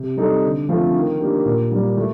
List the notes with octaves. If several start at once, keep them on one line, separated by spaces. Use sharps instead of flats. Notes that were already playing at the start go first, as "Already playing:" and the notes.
Already playing: C3
G3 C4 D#4 A4
D3
F3 A3 C4 F4
D#3
A#3 D4 G4
A#2
G3 A#3
A3